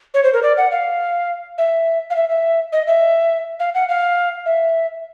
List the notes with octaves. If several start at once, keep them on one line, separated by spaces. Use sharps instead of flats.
C#5
C5
A#4
D5
F#5
F5
E5
F5
E5
E5
D#5
E5
F5
F#5
F5
E5